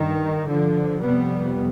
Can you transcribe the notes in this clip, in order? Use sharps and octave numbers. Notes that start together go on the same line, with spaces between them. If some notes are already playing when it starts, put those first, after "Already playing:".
Already playing: G2 D#3
D3 F3
F2 C3 G3 B3